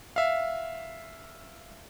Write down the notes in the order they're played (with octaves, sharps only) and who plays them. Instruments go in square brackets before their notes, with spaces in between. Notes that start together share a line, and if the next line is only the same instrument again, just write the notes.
[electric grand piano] E5 F5